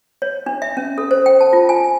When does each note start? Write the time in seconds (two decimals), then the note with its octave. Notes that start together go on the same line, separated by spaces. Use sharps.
0.22 C#5
0.46 D4
0.62 E5
0.77 C#4
0.98 A4
1.11 C5
1.26 G5
1.41 A5
1.53 F4
1.69 G#5